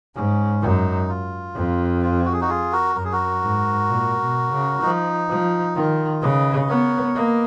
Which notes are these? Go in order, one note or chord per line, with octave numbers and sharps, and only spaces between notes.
G#2 C#4
F#2 D#4
F4
F2
F4
F#4
G#4
D#4 F#4
F4 G#4
F#4 A#4
F#2 A#4
G#4
F#4 A#4
G#2
A#2
B2
C#3
F3 D#4
F3
D#3 F4
C#3 B4 D#5
B3 A#4 C#5
A#3 B4 D#5